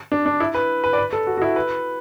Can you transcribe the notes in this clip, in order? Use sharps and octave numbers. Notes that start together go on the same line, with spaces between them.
D4
D4
E4
B4
B4
D5
B4
A4
F#4
F#4
E4
B4